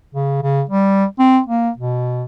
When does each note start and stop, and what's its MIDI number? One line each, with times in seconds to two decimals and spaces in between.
0.15 0.38 49
0.42 0.62 49
0.69 1.05 55
1.19 1.40 60
1.47 1.70 58
1.78 2.24 47